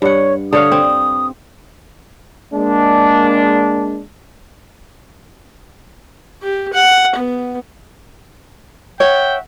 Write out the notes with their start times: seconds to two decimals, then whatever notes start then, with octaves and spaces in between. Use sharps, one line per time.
0.02 G2 C#5 F#5
0.53 D3 C#5 F5 D#6
0.72 C4
2.54 G#3 A#3 D4
6.42 G4
6.73 F#5
7.16 B3
9.00 C#5 E5 F#5 G5